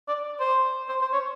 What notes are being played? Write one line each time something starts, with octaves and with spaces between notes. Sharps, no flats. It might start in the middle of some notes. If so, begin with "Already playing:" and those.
D5
C5
C5
C5
C#5